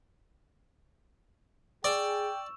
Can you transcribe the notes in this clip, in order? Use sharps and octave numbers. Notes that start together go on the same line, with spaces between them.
G#4 D5 G5 C#6 E6 E7